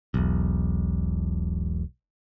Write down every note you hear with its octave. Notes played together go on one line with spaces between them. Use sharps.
E1 B1